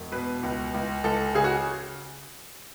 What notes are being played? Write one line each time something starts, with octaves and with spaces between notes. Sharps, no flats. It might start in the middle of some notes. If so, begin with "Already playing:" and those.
Already playing: E1
B2 B4
C#2
C#2
C#2 A4
C#3 G#4
F#4